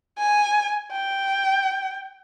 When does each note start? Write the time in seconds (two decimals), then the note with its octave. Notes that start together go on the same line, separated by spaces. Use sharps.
0.18 G#5
0.92 G5